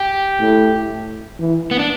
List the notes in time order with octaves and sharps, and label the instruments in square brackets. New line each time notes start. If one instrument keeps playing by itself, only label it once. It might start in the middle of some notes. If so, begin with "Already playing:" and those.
Already playing: [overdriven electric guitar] G4
[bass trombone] A2
E3
[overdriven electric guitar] B3
D4